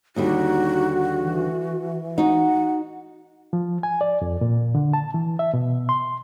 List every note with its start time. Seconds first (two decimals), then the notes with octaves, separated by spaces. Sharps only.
0.16 D#2 D3 G3 D#4 F#4
1.18 E3
2.18 D#4 F#4 F#5
3.53 F3
3.83 G#5
4.01 D5
4.21 F2
4.41 A#2
4.75 D3
4.93 A5
5.14 E3
5.39 E5
5.54 B2
5.89 C6